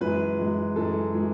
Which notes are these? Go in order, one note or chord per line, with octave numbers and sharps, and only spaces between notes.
F#2 E3 G#3 B4
F#2 E3 G#3
F#2 E3 G#3 A4
E3 G#3